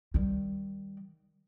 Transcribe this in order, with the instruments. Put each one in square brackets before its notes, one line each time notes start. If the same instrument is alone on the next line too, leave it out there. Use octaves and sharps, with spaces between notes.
[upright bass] D#3 G3